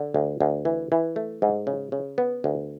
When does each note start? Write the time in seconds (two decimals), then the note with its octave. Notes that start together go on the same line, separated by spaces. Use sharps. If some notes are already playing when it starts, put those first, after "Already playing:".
Already playing: D3
0.14 D2
0.40 D2
0.65 E3
0.92 E3
1.16 A3
1.42 G#2
1.67 C#3
1.92 C#3
2.18 B3
2.44 D2